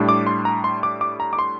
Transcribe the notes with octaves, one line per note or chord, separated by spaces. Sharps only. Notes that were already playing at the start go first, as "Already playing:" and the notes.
Already playing: A2 G3 D4
D6
C6
A#5
C6
D6
D6
A#5
D6
C6